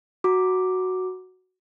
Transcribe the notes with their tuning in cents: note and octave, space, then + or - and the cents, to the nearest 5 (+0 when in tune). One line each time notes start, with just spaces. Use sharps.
F#4 +0 A#5 +0 D6 +0